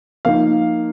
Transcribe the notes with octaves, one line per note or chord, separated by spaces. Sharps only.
F3 A#3 D#4 F5